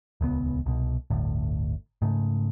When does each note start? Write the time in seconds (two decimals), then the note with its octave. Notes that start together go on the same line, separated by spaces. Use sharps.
0.21 D#1 C#2 B2 B3
0.66 C2 B2
1.10 G1 D2 A2
2.02 G#2 C#3 A3